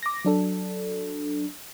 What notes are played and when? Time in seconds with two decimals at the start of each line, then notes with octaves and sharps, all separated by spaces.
0.03 D6 A#6
0.25 F#3 D4 A4